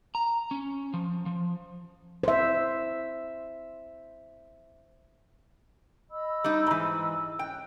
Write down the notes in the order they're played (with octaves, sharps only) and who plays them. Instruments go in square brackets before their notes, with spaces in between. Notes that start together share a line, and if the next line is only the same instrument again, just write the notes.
[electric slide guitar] A#5
C#4
F3
F3
[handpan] C5 E5
[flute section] D#5 B5 E6
[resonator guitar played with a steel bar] G3 D#4
G#2 E3
[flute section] C#4 F#6 [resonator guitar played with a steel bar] G5